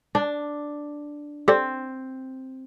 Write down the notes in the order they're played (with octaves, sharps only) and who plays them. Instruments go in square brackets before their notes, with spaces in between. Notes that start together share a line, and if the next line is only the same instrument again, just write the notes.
[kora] D4
[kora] C4 [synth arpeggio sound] G4 A4 D5